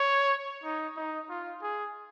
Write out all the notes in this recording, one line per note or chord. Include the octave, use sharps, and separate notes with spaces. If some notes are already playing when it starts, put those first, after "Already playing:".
Already playing: C#5
D#4
D#4
F4
G#4